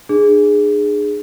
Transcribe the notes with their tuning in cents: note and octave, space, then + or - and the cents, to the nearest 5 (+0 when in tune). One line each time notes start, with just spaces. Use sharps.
D4 +40 G#4 +0